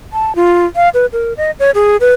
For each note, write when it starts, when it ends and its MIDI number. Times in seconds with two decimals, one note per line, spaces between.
0.13 0.35 81
0.36 0.65 65
0.76 0.89 77
0.94 1.06 71
1.13 1.33 70
1.37 1.51 75
1.60 1.71 73
1.75 1.97 68
2.01 2.14 71